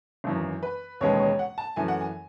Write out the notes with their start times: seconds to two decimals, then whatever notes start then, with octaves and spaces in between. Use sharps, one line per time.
0.24 G#1 F#2 E3
0.63 B4
1.01 E1 D#2 C#3 G#3 B3 C#5
1.19 C#5
1.39 F#5
1.58 A5
1.76 F#2 E3 A3 G#5
1.88 F#5
2.01 G#5